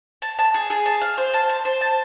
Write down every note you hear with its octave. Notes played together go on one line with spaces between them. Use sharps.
A5
A5
G#4
G#4
A5
F5
C5
A5
A5
C5
A5